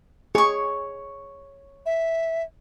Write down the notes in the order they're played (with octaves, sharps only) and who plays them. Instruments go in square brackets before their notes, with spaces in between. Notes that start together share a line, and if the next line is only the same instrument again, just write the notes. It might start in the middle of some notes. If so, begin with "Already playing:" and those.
[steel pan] G#4 [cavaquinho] C#5 C#6
[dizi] E5